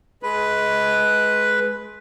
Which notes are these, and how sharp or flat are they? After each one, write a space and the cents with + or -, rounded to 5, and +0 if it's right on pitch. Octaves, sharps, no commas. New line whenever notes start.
G#3 +25 B4 +0